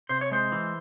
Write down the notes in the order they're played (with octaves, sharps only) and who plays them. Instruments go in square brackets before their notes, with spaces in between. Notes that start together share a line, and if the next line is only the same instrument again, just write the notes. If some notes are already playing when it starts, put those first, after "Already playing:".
[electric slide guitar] C3 C5
C#5
G#3 C5
E3